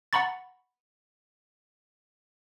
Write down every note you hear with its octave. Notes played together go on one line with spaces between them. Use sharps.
F#5 A#5 B5 C#6 A6